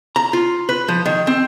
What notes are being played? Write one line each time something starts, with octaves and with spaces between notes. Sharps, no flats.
A#5
F4
B4
F3
D#3
C4